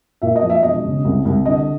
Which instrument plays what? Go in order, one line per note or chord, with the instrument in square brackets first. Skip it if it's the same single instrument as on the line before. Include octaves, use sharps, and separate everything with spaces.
[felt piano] A#2 E5
D#5
F3
E5
E1 D#5
C#3
C2
C2
D3 D#5